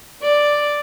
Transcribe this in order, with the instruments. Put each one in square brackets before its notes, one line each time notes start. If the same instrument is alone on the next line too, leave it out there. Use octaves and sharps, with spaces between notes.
[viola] D5